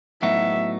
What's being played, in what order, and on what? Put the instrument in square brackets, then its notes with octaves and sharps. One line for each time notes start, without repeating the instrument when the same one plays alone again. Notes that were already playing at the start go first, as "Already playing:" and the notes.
[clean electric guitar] A2 F#3 B3 D#4 F#4 [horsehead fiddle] E5